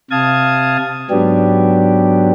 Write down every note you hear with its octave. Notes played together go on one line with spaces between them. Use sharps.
C3 F5 A5 D#6 G#6
G#2 F#3 B3 D4 G4